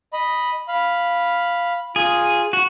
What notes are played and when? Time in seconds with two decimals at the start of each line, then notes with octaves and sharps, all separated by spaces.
0.13 D#5 B5
0.68 F5 B5
1.96 F4 G#4
2.53 F#4